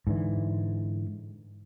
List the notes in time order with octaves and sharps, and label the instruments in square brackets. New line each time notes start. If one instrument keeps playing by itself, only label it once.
[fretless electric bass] G#2 D3 E3